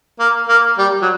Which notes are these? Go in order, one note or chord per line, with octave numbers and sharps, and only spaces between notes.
A#3
A#3
G3
F#3